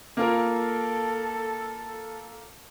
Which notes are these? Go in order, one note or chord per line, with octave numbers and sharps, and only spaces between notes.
A#3 F4 A4 A#4